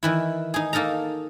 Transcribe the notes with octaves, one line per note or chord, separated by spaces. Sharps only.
D#3 E3 E4
D#4 G#4
A#3 D#4 A4 A#4 A#5